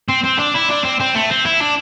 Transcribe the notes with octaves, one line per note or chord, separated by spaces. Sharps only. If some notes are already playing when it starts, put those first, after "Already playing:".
C4
C4
D4
E4
D4
C4
C4
A3
C4
E4
D4